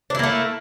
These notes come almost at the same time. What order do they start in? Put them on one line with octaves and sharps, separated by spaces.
D4 E4 A#3 A3